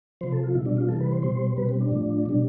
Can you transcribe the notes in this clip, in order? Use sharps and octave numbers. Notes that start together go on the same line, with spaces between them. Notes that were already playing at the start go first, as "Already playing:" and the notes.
C3 F3 C5
A4
F4
B2 G3 E4
D4
F4
C3 E3 G3 A4
B4
C5
B2 G3 C5
B2 G3 B4
C4
D4
A2 F3
B2 G3